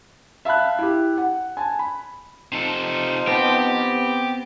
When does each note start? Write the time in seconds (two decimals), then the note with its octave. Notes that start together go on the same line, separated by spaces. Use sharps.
0.45 E5 F5 A5 B5 F#6
0.79 E4 G4
1.18 F#5
1.57 G#5 A5
1.79 B5
2.52 C3 F3 D#4 A4
3.28 B3 C4 G4